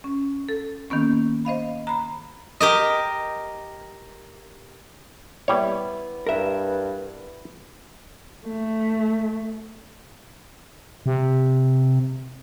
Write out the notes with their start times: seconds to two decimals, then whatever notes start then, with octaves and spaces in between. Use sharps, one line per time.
0.04 C#4
0.49 A4
0.90 D#3 A#3 B3 C#4
1.45 C5 D#5 F5 B5
1.87 A#5 B5
2.60 G4 A#4 D#5
5.48 G3 B3 E4 C#5
6.27 G2 A#4 E5
8.47 A3
11.06 C3